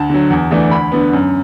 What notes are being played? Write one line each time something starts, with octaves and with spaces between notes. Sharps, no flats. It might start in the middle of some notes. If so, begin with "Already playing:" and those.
Already playing: D2 A5
D3 F#3
E2
E3 A3 D4
D2 B5
D3 B3
F#2